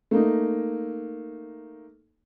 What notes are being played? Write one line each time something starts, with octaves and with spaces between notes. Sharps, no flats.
A3 A#3 D#4